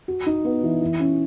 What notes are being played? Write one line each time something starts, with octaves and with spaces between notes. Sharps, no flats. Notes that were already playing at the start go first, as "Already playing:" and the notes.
F#4
D#4
B3
E3
E3
C#4